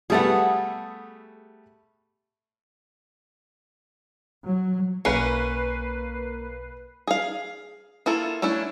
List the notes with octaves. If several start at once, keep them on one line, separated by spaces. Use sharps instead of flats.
G3 A3 B3 G#4 A4 F#5
F#3
B1 A#3 C#4 A#4 B4 C7 C#7
G#4 F5
A#3 E4 F4 A4
A3 C#4 D4 E4